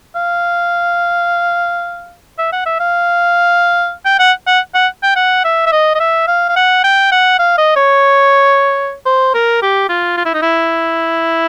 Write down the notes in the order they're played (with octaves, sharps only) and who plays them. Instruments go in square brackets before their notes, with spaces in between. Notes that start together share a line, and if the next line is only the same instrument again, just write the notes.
[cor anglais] F5
E5
F#5
E5
F5
G5
F#5
F#5
F#5
G5
F#5
E5
E5
D#5
D#5
E5
F5
F5
F#5
G5
F#5
F5
D#5
C#5
C5
A#4
G4
F4
F4
E4
D#4
E4